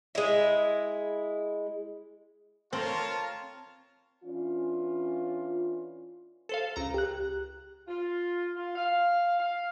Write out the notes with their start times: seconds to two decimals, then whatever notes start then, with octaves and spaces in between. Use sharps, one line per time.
0.15 G#3 E4
2.73 C4 F4 A#4 C#5 A5
4.24 E3 C#4 D4 F4
6.49 A4 C5 F5
6.76 C#2 A#5
6.94 G4 F#6
7.88 F4
8.56 F4
8.76 F5
9.39 F5